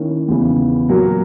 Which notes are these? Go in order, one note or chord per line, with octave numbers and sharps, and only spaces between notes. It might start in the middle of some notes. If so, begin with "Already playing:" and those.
Already playing: D#3 A#3 C#4 E4
E2 C#3 E3
A#2 F#3 A#3